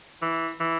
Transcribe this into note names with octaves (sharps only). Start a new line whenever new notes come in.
E3
E3